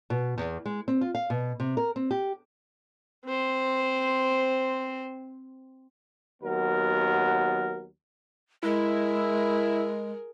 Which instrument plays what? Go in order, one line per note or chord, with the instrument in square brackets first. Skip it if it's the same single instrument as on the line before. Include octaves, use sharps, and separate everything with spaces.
[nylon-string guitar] B2
E2
G#3
C4
F4
F5
B2
C3
A#4
C4
G4
[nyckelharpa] C4 C5
[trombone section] D#2 F#3 B3 A#4
[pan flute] G#3 [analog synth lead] E4 [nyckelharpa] G#4 A#4